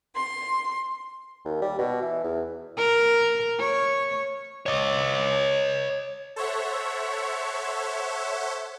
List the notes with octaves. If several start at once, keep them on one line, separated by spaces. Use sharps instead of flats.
C6
D#2
G3
B2
E3
E2
A#4
C#5
C#5 D#5
A4 C5 C#5 E5 F#5